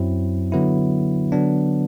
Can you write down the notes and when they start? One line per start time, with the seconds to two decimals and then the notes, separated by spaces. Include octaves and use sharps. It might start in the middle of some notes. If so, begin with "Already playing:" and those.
Already playing: F#2 F#3 C4 E4
0.52 D3 F#3 B3 E4
1.32 D3 F#3 B3 D4